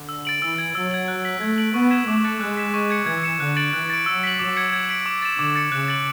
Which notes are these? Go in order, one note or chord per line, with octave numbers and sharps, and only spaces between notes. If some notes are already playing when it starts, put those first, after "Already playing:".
Already playing: D3
E6
A6 D7 F#7
E3 E6
G#6 D7 F#7
F#3 E6
G#6 D7 F#7
F#6
B6 F#7
A3 G#6
D7 F#7
B3 C#6
E6 G#6 B6 E7
A3 D6
F#6 A6 C#7
G#3 F#6
B6 E7
C#6
G#6 C#7
E3 G#6
C#7 E7
D3 F#6
A6 D7 F#7
E3 F#6
A6 D7
F#3 E6
B6 F#7
F#3 D6
G#6 C#7
G#6
B6 D7 F#7
D6
A6 E7
D3 D6
A6 C#7
C#3 F#6
A6 D7 F#7